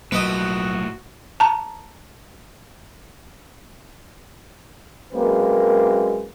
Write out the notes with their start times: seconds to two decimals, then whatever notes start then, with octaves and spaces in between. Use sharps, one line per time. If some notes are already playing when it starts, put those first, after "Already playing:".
0.12 B1 A2 F3 F#3 A#3 F#4 B4 D#5
1.40 A5 A#5
5.13 F#2 G#3 A#3 C4 B4